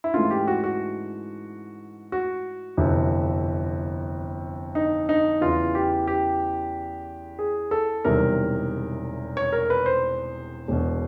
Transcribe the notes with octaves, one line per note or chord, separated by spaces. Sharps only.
E4
G#2 E3 A3 C#4 F4
G4
F#4
F#4
F#4
G1 F2 C3 E3
D#4
D#4
E2 C#3 E3 F4
G4
G4
G#4
A4
E1 E2 C3 D#3 G3 A#4
C#5
A#4
B4
C5
E1 E2 B2